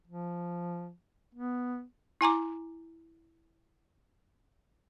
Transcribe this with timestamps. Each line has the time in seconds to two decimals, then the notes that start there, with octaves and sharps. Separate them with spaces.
0.07 F3
1.35 B3
2.21 E4 G#5 A#5 D6